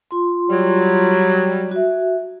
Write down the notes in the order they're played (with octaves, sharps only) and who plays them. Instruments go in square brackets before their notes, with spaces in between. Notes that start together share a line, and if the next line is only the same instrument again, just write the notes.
[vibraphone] F4 C6
[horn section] F#3 G3
[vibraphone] F#4 E5